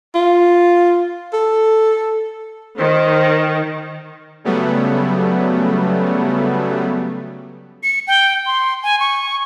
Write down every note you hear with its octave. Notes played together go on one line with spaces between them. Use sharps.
F4
A4
D#3 C5
C#3 F#3 G3 A3 B3
C#7
G5
C6
G#5
C#6